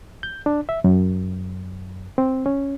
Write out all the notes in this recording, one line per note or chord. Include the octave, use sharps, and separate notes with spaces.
G6
D4
E5
F#2
C4
C#4